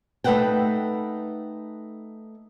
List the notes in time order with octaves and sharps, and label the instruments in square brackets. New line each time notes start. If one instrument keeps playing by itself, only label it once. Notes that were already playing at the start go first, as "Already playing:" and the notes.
[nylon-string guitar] A3 D#4 B4 E5 F#5 G5